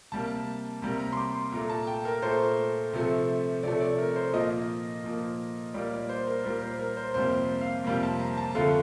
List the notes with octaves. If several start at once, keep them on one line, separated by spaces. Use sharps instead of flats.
C3 G3 A#3 A5
C3 G3 A#3 A#5
A#5
C6
D6
C6
A#2 A3 A#5
A5
G5
A#4
A#2 A3 C5
C3 F3 A3
C3 F3 A3 D5
D5
A#4
C5
A#2 F3 A#3 D#5
A#2 F3 A#3
A#2 G3 A#3 D5
D5
C5
A#4
A#2 G3 A#3 A#4
C5
A#4
C5
F2 C3 G3 A#3 C5
F5
F2 C3 G3 A#3
A5
A#5
A5
F2 D3 F3 A3 F5